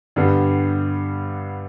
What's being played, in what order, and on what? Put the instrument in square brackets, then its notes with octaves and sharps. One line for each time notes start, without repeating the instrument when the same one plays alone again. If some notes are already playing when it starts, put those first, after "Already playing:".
[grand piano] G2 D3 G3 B3